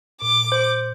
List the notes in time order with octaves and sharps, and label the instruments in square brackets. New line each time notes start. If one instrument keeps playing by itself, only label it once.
[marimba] A#2 [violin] D6
[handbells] C5